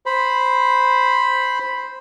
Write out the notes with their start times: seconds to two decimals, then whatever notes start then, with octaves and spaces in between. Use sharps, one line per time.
0.06 C5 B5